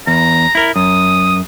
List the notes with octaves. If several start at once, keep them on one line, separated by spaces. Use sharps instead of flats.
E2 A#5
E4 A#4
F#2 D#6